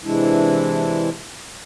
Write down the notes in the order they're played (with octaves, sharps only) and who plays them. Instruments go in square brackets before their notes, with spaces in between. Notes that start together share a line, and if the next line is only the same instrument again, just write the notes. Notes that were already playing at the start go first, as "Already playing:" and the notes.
[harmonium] C3 E3 G#3 D4 E4